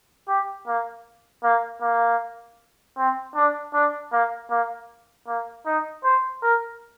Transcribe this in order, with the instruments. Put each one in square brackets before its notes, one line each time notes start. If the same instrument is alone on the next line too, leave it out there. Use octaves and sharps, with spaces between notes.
[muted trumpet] G4
A#3
A#3
A#3
C4
D4
D4
A#3
A#3
A#3
D#4
C5
A#4